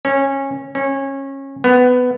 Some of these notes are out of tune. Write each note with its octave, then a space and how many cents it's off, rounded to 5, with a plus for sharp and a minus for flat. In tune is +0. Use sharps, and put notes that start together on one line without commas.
C#4 -20
C#4 -25
B3 +15